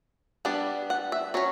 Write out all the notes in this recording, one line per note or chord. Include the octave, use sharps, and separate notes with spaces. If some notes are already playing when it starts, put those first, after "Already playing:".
G3 B3 D4
F#5
E5
F#3 C#4 C#5